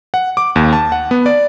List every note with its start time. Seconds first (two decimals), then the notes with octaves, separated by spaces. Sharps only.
0.14 F#5
0.37 D6
0.56 D#2
0.73 A5
0.92 F#5
1.11 B3
1.26 D5